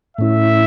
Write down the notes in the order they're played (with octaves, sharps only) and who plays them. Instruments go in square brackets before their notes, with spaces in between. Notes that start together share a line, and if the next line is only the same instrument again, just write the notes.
[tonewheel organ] A2 A3 C#4 E4 [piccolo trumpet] E5